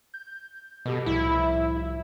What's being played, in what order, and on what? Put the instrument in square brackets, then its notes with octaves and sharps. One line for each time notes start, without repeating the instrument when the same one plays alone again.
[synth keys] G6
[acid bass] B2 [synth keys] G4 A4 D#5
[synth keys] C2 A2 F3 [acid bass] E4